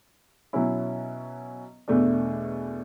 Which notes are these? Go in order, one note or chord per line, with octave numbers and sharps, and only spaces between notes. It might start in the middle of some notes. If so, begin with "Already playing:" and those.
B2 F#3 C#4 E4
E2 B2 A3 D4